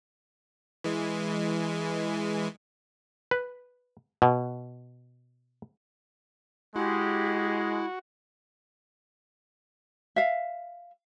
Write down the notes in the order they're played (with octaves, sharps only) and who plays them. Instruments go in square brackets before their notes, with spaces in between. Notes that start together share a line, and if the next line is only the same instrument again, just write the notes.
[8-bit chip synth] E3 G#3
[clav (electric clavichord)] B4
B2
[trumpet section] G#3 [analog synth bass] E4 [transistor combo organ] F#4 [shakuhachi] G4
[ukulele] E5 F5